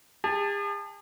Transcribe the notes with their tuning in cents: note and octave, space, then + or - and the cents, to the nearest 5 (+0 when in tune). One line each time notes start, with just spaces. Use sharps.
G#4 -45 A5 +0